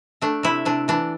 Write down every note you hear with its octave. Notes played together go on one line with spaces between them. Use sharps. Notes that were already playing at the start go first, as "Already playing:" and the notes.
A3 D4
C3 E4
C3 D4
E3 D4